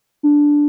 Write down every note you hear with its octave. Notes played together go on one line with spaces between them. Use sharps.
D4